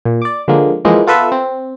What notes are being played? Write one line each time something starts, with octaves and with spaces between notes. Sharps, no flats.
A#2
D5 D6
D3 F3 G#3 A#3
E3 F3 G#3 A#3 D#4 E4
B3 F4 A4 B4 E5
C4